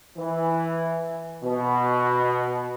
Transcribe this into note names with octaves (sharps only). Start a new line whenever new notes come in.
E3
B2